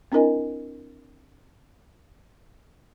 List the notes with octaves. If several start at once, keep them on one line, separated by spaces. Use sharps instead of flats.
C4 D4 E4 A#4 D#5 G#5